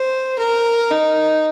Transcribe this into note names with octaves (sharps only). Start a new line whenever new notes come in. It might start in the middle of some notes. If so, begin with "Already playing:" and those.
Already playing: C5
A#4
D#4